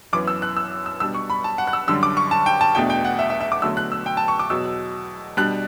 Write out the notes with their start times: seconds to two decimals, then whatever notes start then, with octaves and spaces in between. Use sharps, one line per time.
0.13 F#2 E3 B3 D6
0.27 E6
0.42 F#6
0.56 E6
0.86 E6
1.00 B2 G3 D4 E6
1.15 C#6
1.30 B5
1.44 A5
1.58 F#5
1.67 F#6
1.73 E6
1.88 F#2 D3 G3 D4 E6
2.03 D6
2.17 C#6
2.31 A5
2.46 G5
2.61 A5
2.75 E2 B2 A3 D4 G5
2.90 G5
3.05 F#5
3.19 E5
3.30 E5
3.40 E5
3.52 D6
3.62 E2 D3 F#3 A3 E6
3.77 F#6
3.92 E6
4.06 G5
4.17 A5
4.28 C#6
4.39 D6
4.50 E2 B2 F#3 E6
5.37 B2 G3 D4 F#6